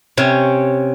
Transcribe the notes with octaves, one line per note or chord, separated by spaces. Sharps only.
C3 C#4